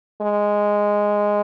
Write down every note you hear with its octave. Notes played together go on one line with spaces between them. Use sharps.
G#3